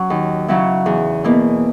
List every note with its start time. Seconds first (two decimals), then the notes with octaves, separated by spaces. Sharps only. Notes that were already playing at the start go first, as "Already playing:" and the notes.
Already playing: F#3 C#4
0.10 D#2
0.48 C#3 F#3 C#4 E4
0.86 E2
1.24 B2 A#3 E4